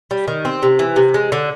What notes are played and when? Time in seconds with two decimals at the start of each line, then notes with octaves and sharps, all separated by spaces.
0.11 G3
0.28 D#3
0.45 C4
0.63 C3
0.79 E3
0.96 C3
1.14 G#3
1.32 D3